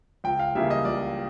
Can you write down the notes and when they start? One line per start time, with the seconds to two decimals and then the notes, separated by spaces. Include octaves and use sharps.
0.24 C#2 G5
0.40 F5
0.55 C#3 E3 G3 A#3 E5
0.70 D#5
0.85 C#2 D5